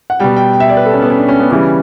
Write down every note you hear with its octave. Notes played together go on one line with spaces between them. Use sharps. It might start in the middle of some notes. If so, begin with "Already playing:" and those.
F#5
B2 G3 G5
G5
G5
E5
D5
B4
A4
C#4
B3
C#4
D4
C#4
B3
C#3 E3 G3 C#4